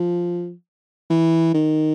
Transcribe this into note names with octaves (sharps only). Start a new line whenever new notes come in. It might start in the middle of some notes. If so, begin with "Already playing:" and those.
Already playing: F3
E3
D#3